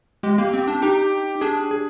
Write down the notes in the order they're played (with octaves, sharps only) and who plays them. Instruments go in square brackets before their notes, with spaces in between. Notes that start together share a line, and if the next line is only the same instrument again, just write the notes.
[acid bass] G#3 [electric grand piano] G4
[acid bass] A#3 [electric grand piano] G4
[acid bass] C4
D4
[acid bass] D#4 [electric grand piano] G4
[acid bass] D4 [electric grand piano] G#4
[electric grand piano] G#4